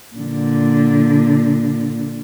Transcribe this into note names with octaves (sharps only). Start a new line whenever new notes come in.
A#2 D3